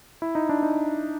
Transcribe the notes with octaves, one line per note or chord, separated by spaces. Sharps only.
E4
D#4
D4
D#4